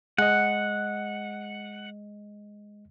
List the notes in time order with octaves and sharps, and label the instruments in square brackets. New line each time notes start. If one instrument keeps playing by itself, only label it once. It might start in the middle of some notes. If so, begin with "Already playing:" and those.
[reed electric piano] G#3 D#5 [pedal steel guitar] F#5